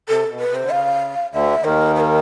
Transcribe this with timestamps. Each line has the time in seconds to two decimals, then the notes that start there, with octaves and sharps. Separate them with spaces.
0.08 C3 A4
0.30 B2
0.40 B4
0.50 C3 C5
0.62 D3
0.71 C#3 F5
1.33 D2 D3 E5
1.64 D#2 D#3 A#4
1.95 B4
2.00 A#4